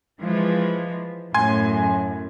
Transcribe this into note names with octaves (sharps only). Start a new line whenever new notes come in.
E3 F3 G#3
F#2 A2 G#5 C6 G#6